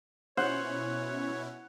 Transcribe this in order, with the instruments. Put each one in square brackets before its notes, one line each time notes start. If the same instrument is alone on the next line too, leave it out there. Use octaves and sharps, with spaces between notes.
[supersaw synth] B2 C#4 E4 [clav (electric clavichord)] C5 [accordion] C#5 [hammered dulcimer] F#5